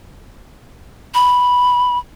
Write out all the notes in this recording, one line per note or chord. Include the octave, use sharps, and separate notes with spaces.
B5